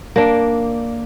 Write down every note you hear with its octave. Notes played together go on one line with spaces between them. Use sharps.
A#3 D4